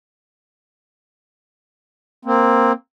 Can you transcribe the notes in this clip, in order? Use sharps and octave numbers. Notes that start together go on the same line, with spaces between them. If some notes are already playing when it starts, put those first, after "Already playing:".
A#3 C4